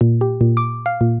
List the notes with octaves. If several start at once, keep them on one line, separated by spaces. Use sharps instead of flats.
A#2
G4
A#2
D6
F5
A#2